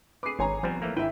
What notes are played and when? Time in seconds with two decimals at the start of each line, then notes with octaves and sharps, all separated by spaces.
0.23 G#4 B4 D6 C7
0.39 G#1 C#5 G#5 A#5
0.63 F3 G3 B3 C4
0.82 E3 A3 A#3
0.96 G#1 E4 B4 E5 G5